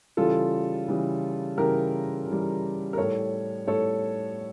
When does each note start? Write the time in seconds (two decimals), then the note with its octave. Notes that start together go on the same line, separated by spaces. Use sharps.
0.17 C#3 E3 G3 F4 A4
0.88 C#3 E3 G3
1.57 C#3 E3 G3 G4 A#4
2.27 C#3 E3 G3
2.93 A#4
2.97 A2 G3 A4 C#5
3.67 A2 G3 A4 C#5